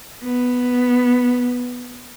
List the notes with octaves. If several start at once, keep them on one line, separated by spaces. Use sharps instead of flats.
B3